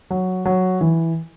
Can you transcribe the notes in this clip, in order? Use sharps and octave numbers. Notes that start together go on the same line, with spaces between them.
F#3
F#3
E3